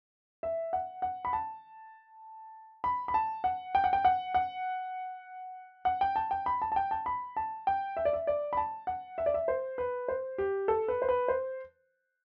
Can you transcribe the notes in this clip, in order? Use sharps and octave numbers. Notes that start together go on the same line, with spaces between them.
E5
F#5
F#5
B5
A5
B5
B5
A5
F#5
G5
F#5
G5
F#5
F#5
F#5
G5
A5
G5
B5
A5
A5
G5
A5
B5
A5
G5
E5
D5
E5
D5
B5
A5
F#5
E5
D5
E5
C5
B4
C5
G4
A4
B4
C5
B4
C5